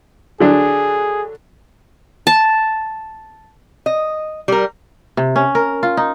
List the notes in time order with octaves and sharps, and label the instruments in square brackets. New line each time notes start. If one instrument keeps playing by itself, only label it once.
[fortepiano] D3 F#3 D4 [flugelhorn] G#4
[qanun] A5
[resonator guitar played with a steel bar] D#5
G3 A#4
[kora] C3
C#4
A#4
F4
D#4